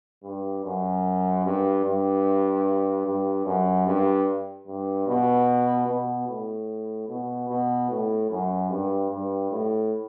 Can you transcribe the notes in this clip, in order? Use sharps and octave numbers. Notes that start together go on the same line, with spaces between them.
G2
F#2
G2
G2
G2
F#2
G2
G2
B2
B2
A2
B2
B2
A2
F#2
G2
G2
A2